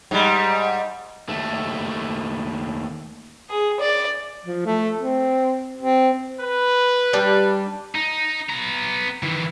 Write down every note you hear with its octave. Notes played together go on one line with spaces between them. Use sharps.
G#2 G3
D#2 A3
G#4
D5
F3
A3
C4
C4
B4
G3 D4
D#4
B3 A#5
D#3 E3